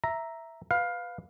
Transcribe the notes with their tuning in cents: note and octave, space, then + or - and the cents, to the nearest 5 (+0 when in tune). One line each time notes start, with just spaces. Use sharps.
E5 +0 A#5 +0
B4 +5 F5 +15